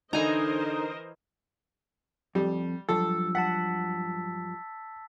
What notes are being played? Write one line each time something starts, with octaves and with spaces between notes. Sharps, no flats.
D3 E3 D#4 A#4 C5 D#5 G#5 A#5
F2 G3
G2 F3 F#3 A4 E6
F#5 A5 A6 B6